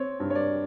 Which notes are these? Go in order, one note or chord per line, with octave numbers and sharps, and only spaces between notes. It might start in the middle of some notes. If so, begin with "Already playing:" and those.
Already playing: C4 C#5
G2
C#5
D5